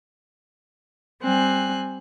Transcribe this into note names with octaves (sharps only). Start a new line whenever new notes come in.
G3 C4 G#5 F#6